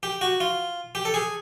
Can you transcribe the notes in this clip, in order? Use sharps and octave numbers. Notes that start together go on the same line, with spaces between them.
G4
F#4
F4
G4
A4
G#4